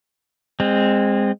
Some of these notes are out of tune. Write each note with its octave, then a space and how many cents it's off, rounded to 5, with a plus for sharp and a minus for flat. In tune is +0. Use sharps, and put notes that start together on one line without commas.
G#3 -25 C4 +0